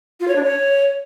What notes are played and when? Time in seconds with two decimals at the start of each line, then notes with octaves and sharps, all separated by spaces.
0.20 F4
0.28 C#5
0.35 D4
0.43 C#5